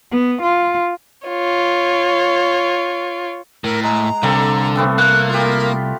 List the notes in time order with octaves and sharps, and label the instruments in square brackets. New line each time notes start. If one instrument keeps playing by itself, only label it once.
[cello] B3
F4
[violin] F4 C#5
[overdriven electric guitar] A2 [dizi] A#4
[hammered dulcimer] G#3 [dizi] A#5
[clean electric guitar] C2 [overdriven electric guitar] D3 [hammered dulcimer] A#3 C4 A4
[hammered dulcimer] A3 B3 C4
[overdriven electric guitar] A#3 [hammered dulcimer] F#5 [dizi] F#6
[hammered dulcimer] F4 G4 [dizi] A#4